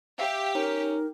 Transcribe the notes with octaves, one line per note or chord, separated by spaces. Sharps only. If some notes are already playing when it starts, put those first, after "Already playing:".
G4 E5 F5
C#4 D#4 A#4